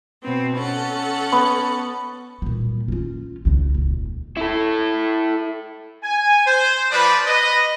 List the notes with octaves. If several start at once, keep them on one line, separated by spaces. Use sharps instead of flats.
B2 B3 C4
C#4 A4 F#5
B3 C#6
A#2 G3
C#4 F4
C#2 C#3
D#1 C#2
E4 A4
G#5
C5
F3 B4 D5
B4 D#5